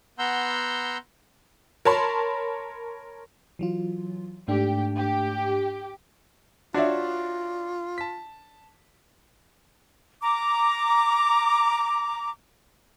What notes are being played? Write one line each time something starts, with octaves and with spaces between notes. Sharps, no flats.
B3 F#5 A#5 C6 E6 G6
A#4 C#5 A5 B5 C6
E3 F#3 F4
G#2 A3 D4 G4
G4
D4 F4 F#4 C#5 D5 E5
A5 B6
A#5 D6